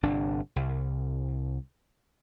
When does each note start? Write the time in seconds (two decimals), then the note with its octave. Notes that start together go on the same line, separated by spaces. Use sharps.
0.03 G1 C3 D4
0.56 C2